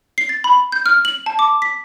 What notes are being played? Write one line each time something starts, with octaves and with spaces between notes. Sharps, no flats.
C7
A6
B5
G6
F6
F#7
A5
D6
B6